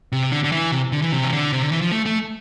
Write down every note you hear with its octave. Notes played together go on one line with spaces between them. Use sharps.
C3
D3
D3
E3
C3
D3
E3
C3
E3
D3
C3
D3
E3
F3
A3
A3